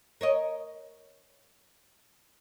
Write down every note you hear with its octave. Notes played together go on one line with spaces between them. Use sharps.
A#4 C#5 D#5